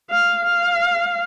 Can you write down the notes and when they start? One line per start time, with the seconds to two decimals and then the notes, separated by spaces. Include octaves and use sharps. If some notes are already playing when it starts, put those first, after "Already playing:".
0.11 F5
0.46 F5